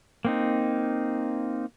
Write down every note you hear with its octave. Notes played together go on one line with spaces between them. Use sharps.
A#3 C4 D#4